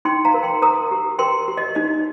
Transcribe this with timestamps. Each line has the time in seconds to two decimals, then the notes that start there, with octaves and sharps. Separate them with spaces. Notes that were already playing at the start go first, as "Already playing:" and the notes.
0.05 D#4 G5 C6
0.25 F5 A#5
0.34 A#4
0.43 G5 C6
0.62 A#4 A#5 D#6
0.91 G4
1.19 A#4 G5 C6
1.48 G4
1.57 D#5
1.75 D#4 D#5